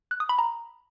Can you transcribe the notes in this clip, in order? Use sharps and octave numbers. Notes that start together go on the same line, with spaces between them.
F#6
D#6
B5
A#5